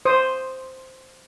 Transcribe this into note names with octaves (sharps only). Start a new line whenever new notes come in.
C5 D#6